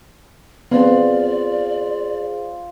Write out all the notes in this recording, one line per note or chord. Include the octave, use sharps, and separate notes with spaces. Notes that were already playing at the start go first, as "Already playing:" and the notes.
B3 C4 F4 G#4 C5 D5